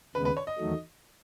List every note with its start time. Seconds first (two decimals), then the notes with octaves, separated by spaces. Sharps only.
0.15 D#2 C#3 G#3 B3 B4
0.25 B4
0.37 C#5
0.47 D#5
0.58 E2 D#3 F#3 A3